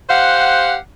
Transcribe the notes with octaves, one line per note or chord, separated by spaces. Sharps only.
G4 C5 F5 F#5